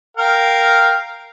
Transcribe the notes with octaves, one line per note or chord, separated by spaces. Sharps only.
A#4 F5 G5